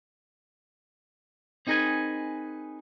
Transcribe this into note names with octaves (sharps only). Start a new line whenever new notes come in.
C4 D#4 G#4 A#4 B4 G#5